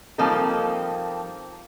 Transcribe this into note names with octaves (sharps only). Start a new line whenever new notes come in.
F3 G3 A#3 C4 D#4 A4